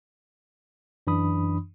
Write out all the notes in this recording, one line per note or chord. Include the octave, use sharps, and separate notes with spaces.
F#2 E3 D4 B5 D#6